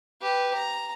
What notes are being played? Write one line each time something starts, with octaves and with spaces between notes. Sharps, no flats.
G4 B4
A#5